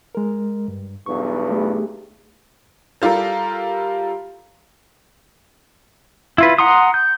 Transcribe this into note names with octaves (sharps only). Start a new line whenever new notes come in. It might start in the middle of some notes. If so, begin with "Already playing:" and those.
G#3 A#4
G2
B1 E2 G2 C#6
A3 G4 G#4
G3 F4 G4 A4 A#4
E4 F4 B4
F#5 A#5 C6 D#6
G6